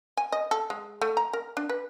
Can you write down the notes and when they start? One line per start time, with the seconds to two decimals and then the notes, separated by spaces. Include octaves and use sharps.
0.17 G#5
0.32 D#5
0.51 A4
0.70 G#3
1.02 A3
1.17 A#5
1.33 A#4
1.57 D4
1.69 B4